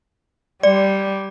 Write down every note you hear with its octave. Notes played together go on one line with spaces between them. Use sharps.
G3 D5